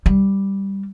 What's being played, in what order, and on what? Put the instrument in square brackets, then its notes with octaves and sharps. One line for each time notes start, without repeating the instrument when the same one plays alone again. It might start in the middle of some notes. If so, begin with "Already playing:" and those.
[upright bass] G3